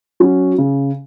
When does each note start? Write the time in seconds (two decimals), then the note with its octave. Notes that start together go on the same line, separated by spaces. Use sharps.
0.20 F#3 C#4 F#4
0.58 C#3